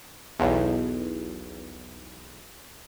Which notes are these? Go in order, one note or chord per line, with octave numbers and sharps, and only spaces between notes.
B1 E2